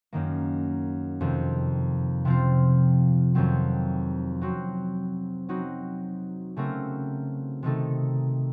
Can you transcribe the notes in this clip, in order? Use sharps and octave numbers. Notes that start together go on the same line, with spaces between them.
F#2 D#3 A#3
F2 C3 D#3
C3 F3 C4 F4
F2 D#3 F#3 C4
F#3 C4 F#4
F#3 C4 D#4 F#4
C#3 A3 C4 F#4 A#4
C3 D#3 A3 D#4 A4